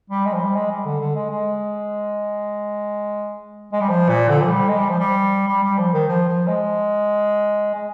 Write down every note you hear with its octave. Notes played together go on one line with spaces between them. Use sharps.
G3
G#3
F3
G3
G#3
G3
D3
D3
G#3
G#3
G#3
G3
F3
A#2
D3
F3
G3
G#3
G3
F3
G3
G3
G3
F3
D#3
F3
F3
G#3
G#3